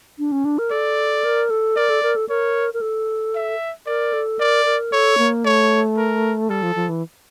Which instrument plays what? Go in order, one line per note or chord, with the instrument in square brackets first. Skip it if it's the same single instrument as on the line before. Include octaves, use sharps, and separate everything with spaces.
[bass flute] D4
C#4
D4
A#4
[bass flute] A4 [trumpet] D5
[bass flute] A#4
A4
[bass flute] A#4 [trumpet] D5
[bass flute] A4
A#4
A4
[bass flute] A#4 [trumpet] C#5
[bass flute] A#4
A4
[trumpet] E5
[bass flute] A#4 [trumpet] D5
[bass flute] A4
[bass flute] A#4 [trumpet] D5
[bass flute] A#4
[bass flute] A4 [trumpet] C#5
[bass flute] A#3
[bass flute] A3 [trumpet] C#5
[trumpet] A#4
[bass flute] G3 [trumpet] A4
[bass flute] F3
F3
E3